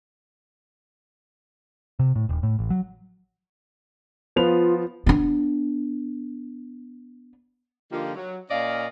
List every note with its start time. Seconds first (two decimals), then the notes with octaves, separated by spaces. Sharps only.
1.99 C3
2.15 A2
2.29 D#1
2.43 A2
2.59 A1
2.70 F#3
4.36 F3 B3 F4 F7
5.06 B3 D4
7.92 D3 F3 A#3 D#4 F4 G4
8.16 F#3
8.51 A#2 C#4 D5 D#5 F5